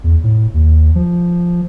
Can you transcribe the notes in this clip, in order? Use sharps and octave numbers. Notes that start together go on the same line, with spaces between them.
E2
A2
D#2
F3